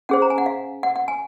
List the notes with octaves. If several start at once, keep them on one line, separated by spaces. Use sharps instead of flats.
C#4 G#4 C5 F#5
A#5
G#5
F#5
F5
F#5
F#5
G#5